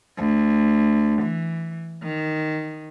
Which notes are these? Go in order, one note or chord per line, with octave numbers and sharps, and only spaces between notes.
D2
E3
D#3